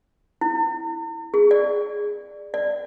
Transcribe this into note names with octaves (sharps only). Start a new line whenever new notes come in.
E4
G#4
D5
D5